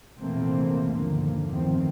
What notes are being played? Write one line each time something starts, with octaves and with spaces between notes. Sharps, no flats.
A#1 E2 C3 A3 A#3 C4
G1 D#2 A#2 D3 F3 A#3
G1 E2 A2 D#3 F3 C4